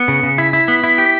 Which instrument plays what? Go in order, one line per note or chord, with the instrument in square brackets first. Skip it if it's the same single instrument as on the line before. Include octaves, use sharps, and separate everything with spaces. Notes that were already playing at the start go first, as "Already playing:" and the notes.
Already playing: [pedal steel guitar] B3 [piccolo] C#7
[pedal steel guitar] C#3
C#3
[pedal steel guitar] E4 [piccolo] B6
[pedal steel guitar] E4
B3
E4
G4